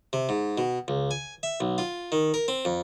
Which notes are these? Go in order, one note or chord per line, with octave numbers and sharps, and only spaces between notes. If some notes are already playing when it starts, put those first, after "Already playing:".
C3
G#2
B2
C#2
G#5
E5
B1
F4
D#3
A#4
C4
F2